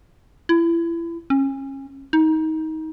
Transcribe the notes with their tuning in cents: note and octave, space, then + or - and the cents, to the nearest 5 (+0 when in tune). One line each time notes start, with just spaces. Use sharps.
E4 +30
C#4 -30
D#4 +25